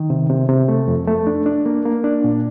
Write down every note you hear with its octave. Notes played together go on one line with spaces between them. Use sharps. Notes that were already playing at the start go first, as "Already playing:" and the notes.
Already playing: D#3
C3
C3
C3
A3
F2
A3
D4
D4
A#3
A#3
D4
A#2